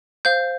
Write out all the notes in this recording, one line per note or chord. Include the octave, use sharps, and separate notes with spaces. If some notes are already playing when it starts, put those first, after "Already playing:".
C5 F5 G6